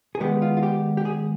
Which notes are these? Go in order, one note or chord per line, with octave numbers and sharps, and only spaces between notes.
G#4
D#3 G#3 B3 G4
F4
F4
G4
G4
G#4